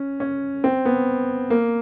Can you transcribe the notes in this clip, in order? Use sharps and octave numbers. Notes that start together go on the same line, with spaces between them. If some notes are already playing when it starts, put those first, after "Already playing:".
Already playing: C#4
C#4
C4
B3
A#3